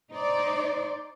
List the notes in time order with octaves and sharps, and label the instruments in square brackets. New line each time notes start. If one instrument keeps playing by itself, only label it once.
[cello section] D#4 C5 D5